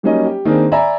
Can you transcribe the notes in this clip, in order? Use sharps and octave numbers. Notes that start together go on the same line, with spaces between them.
F#3 G3 A#3 C#4 D#4 D#5
G4
D#3 A#3 C4 D4 G#4
D5 E5 G#5 A#5 B5